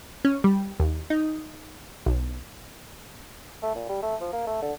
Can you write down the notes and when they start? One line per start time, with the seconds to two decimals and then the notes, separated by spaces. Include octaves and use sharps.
0.25 C#4
0.44 G3
0.80 D#2
1.10 D#4
2.06 B1
3.63 A3
3.75 A#2
3.89 G3
4.03 A3
4.21 F3
4.33 A#3
4.47 A3
4.62 D3